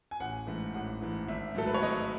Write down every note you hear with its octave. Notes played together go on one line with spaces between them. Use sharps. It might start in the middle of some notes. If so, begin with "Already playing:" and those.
G#5
A1 F#5
G#2 E3 A3
A1 F#5
G#2 E3 A3
G#1 E5
G#2 F#3 A3 A4
B4
C#5
G#1 D#5